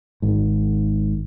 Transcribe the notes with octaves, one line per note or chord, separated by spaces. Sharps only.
G#1 G#2